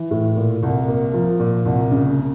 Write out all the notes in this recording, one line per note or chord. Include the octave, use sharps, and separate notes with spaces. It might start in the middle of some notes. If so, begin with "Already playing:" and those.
Already playing: E3
A2
A#2
C2
A#3
F3
A#2
C2
C#3